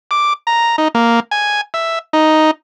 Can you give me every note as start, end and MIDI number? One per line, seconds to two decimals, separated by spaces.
0.11 0.33 86
0.47 0.76 82
0.78 0.88 63
0.95 1.20 58
1.31 1.61 80
1.74 1.99 76
2.13 2.51 63